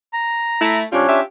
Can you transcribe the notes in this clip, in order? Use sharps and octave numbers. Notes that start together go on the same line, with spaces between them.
A#5
A3 E4
C3 G3 C#4 D4 F4
F4 G4 E5